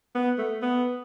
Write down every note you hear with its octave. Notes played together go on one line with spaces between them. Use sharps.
B3
A3
B3